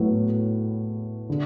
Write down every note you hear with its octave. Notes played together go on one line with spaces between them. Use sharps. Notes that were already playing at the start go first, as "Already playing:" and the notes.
Already playing: A2 F#3 B3 E4 B4
D3